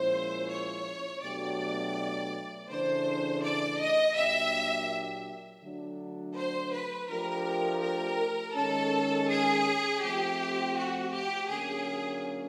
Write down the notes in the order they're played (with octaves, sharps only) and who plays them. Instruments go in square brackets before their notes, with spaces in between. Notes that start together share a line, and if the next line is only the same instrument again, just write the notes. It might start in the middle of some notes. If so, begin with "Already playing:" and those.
Already playing: [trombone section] A#2 F3 G#3 C#4 E4 [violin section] C5
[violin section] C#5
[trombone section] B2 F#3 A3 D4 G4 [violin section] D5
[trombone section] C#3 E3 A3 D4 [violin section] C5
[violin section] D5
D#5
[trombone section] A#2 F#3 A#3 D4 G4 [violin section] E5
[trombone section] D3 F#3 A3 D4
[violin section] C5
B4
[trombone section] F3 A3 D4 G4 [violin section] A#4
[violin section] A#4
[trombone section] D#3 G#3 C#4 [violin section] A4
[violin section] G#4
[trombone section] F3 A3 C4 [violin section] G4
[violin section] F#4
G4
[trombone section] D3 F#3 A#3 C#4 [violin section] G#4